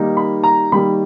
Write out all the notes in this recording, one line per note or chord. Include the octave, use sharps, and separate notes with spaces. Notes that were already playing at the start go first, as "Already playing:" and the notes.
Already playing: D#3 G3 A#3 D#4
B5
A#5
D#3 G3 A#3 D#4 B5